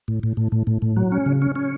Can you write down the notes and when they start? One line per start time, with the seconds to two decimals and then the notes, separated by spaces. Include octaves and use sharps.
0.08 A2
0.23 A2
0.37 A2
0.52 A2
0.67 A2
0.82 A2
0.97 F#3
1.12 C#4
1.26 C#3
1.42 C#4
1.56 C#4